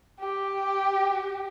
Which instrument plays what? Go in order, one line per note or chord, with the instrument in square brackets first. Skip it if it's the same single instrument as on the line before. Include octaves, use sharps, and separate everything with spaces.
[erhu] G4